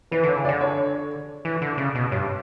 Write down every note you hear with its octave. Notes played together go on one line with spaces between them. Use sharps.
E3 B4
D3 C#5
C#3
D5
D3
C#5
E3
D3
C#3
B2
G2 C#5